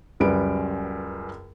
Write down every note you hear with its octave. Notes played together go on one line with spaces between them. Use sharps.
C#2 F#2 G3 B4 D7